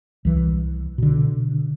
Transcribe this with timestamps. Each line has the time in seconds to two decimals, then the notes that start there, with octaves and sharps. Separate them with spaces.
0.25 C2 E3
0.98 B2 D3